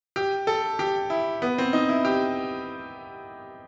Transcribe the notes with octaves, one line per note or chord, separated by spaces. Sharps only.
G4
A4
G4
E4
B3
C4
D#4
E4
G4